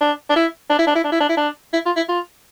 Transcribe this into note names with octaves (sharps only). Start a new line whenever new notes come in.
D4
D4
E4
D4
E4
D4
E4
D4
E4
D4
E4
D4
E4
F4
E4
F4